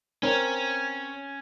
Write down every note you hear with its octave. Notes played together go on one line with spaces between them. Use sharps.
C4 C#4 A#4 C#5